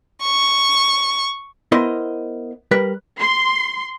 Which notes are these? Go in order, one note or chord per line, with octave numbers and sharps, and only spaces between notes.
C#6
B3 E4 A#4 C5 D#5 C6
G3 A#4 B4
C6